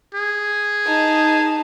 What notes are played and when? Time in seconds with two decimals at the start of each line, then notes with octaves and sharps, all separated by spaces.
0.15 G#4
0.86 D#4 A5